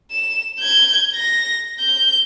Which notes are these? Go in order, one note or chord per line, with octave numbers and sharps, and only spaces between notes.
E7
G6 G#6
A#6
G6